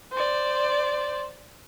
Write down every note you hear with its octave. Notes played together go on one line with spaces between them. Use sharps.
C5 D5